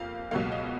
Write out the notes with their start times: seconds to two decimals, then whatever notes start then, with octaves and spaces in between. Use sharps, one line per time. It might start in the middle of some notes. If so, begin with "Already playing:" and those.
Already playing: F2 F3 A#3 F5
0.31 C#2 B2 F#3 A#3 F5
0.52 D#5